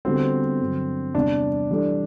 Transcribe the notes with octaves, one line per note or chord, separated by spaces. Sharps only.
D3 G3 B3 C4 F#4 C5
G2 D3 F#3
E2 C3 G3 D4
E3 G3 D4 A4 D5